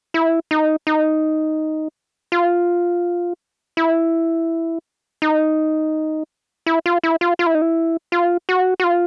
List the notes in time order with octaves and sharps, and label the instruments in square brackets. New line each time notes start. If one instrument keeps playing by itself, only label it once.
[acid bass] E4
D#4
D#4
F4
E4
D#4
E4
F4
E4
F4
F4
E4
D#4
E4
F4
F#4
F#4
F4